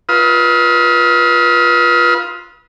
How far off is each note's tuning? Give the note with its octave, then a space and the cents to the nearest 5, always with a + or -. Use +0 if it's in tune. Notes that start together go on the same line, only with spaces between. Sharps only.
F4 +0 B4 -30 D#6 +40